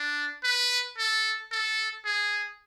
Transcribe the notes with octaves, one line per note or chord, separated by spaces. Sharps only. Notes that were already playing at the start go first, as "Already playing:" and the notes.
Already playing: D4
B4
A4
A4
G#4